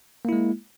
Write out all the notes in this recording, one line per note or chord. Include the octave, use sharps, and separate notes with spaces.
G#3 A#3 E4